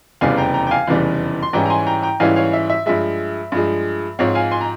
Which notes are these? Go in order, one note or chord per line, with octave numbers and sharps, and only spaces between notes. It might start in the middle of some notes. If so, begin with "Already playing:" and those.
F1 E2 C#3 E3 G3 F5 G#5
G5 A#5
G5 A#5
G5
F5 G#5
F1 E2 C#3 E3 G3
C6
G#2 E3 G3 C#4 E4 G5 A#5
A#5
G#5 C6
G5 A#5
G5 A#5
G#2 E3 G3 C#4 E4 F5 G#5
C#5 F5
E5
E5
G2 F3 G#3 E5
G2 F3 G#3
G#2 F3 C4 C#5 F5
F5 G#5
G#5 C6
A#5